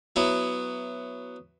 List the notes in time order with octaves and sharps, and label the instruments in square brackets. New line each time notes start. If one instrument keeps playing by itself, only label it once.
[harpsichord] F#3 B3 E4